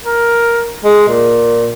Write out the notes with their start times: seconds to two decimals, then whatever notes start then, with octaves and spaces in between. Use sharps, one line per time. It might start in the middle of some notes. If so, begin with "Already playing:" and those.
0.04 A#4
0.84 G#3
1.08 A#2